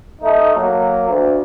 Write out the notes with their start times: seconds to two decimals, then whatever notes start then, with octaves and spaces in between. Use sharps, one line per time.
0.22 A3 D#4
0.55 F#3 A#3
1.07 D2